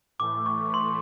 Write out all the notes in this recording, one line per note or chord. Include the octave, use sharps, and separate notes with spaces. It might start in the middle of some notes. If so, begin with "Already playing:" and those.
A2 E3 A3 D6
C#6
C6